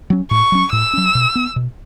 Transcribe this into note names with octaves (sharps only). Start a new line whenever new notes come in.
F#3 C#4
A2 C#6
F#3 C#4
A2 E6
F#3 C#4
B2
B3
B2